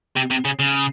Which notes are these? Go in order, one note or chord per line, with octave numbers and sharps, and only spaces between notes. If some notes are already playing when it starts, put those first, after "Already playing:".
C3
C3
C#3
C#3